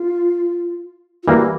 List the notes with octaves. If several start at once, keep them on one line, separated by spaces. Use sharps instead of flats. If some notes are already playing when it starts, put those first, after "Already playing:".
Already playing: F4
F4
E3 G3 A#3 F#4